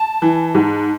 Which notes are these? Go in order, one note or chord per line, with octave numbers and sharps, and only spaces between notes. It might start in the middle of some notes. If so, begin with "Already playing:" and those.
Already playing: A5
E3
G#2